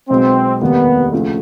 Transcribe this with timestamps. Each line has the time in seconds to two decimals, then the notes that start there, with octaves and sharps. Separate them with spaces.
0.10 B1 B2 G#3 C4
0.61 F1 D#2 D#3 G3 A#3 B3
1.12 D2 C#3 F3 A3